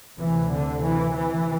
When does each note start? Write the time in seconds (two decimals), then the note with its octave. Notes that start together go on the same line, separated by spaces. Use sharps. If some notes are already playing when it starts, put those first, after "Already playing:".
0.17 D2 C3 E3
0.49 D3
0.81 E3
1.12 E3